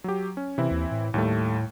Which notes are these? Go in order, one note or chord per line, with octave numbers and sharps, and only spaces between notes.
F#3 G4
C#4
C3 E3 C4 E4
D#2
A2
D#2 A2 G3 A3